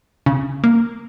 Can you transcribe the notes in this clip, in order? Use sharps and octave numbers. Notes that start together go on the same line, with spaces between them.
C#3
A#3